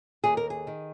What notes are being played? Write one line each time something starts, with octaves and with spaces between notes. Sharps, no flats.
D#2 G#4
A#4
G#4
D#3